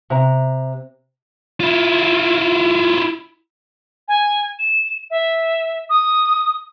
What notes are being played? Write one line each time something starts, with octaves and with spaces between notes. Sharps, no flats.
C3 A#5
E4 F4
G#5
E7
E5
D#6